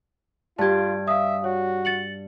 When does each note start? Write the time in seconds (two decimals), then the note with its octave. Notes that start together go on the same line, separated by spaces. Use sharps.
0.58 G2 F4 G4 A5 G#6
1.08 E5 F5 D#6
1.44 F#4 C#5
1.85 A6 C#7 F#7